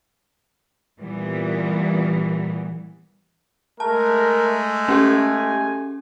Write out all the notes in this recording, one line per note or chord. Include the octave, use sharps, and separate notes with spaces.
A#2 E3 G3 B3
G#3 A3 A#4 A5
C#4 G4 A4 G#5